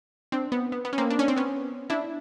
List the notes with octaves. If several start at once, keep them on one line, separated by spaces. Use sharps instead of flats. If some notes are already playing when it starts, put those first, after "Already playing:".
C4 D4
B3
B3
B3
C#4
A#3 C4
D4
C#4
C4
B3 C#4
D4 E4